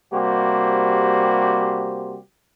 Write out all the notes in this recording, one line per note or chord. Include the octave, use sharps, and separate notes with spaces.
C3 G3 A#3 F#4 G4 C5